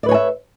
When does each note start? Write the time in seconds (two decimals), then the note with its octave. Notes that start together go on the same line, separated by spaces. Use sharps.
0.03 D5
0.06 B4
0.09 C#5
0.11 G#5
0.14 E5